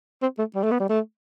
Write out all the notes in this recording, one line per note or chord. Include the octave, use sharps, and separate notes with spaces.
C4
A3
G3
A3
B3
G3
A3